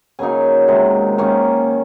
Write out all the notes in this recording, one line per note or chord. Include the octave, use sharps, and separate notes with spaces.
C#3 F#3 A#3 D#4 G#5
C3 D#3 G#3
D#3 A#3 C#4